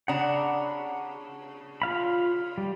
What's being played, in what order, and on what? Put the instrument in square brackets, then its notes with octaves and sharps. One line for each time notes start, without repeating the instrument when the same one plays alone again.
[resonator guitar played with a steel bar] C#3 D4 [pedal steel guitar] F#5 A#5 B5
[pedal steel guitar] F4 F5 B5
G3